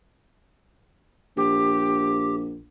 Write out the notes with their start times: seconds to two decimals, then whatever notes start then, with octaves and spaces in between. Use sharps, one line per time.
1.37 A#1 G4